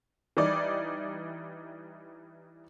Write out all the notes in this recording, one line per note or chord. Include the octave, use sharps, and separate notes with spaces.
E3 G3 D#4 D5